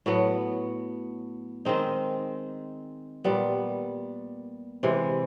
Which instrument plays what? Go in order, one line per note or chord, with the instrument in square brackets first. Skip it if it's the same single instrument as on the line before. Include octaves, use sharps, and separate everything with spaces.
[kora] A2 F#3 B3
D#3 G#3 C4 D#4
A#2 G3 B3
C3 E3 G#3